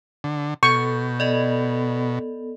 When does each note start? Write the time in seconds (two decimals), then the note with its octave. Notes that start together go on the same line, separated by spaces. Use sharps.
0.24 D3
0.63 B2 A4 C#6 G6
1.20 B3 A4 D5 D#5